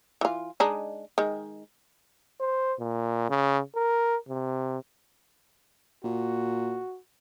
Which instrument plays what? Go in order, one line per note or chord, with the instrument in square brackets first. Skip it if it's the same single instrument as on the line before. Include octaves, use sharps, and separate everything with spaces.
[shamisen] E3 F4
G#3 D4 D#4
D#3 G#3
[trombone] C5
A#2
C#3
A#4
C3
[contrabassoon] A#2 [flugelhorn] F#4